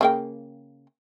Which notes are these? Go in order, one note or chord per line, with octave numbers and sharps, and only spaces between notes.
C#3 A#3 G5